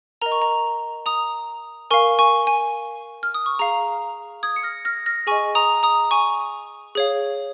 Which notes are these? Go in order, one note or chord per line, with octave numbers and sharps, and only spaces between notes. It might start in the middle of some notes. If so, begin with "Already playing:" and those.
A#4 D#5 A#5
C#6
A#5
A#5 D#6
A#4 F5 G#5 C#6
G#5 C#6
G#5
F6
D#6
C#6
G#4 F5 A#5
D#6 G#6
C#7
F6 A#6
F6 A#6
F6 A#6
G#4 D#5 G#5 C#6
A#5 D#6
A#5 D#6
G#5 C#6
G#4 C#5 F5